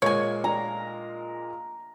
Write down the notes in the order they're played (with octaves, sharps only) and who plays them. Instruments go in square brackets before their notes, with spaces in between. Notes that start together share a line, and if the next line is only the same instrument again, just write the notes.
[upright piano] A#2 G#3 A#3 [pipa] C#5 G#5
[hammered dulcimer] A#5